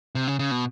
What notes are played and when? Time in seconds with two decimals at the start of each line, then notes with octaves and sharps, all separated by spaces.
0.15 C3
0.27 C#3
0.39 C#3
0.51 B2